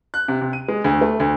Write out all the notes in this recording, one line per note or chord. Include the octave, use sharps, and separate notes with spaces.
F#6
C3
C3
D#7
G#3
D2
A3
D2